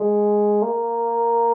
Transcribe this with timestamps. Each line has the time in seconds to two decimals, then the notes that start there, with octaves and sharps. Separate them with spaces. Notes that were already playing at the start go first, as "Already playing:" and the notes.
Already playing: G#3
0.62 A#3